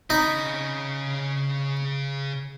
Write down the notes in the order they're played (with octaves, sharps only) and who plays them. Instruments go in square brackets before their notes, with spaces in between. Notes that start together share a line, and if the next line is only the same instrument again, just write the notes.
[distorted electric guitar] C#3 B5 [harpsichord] D#4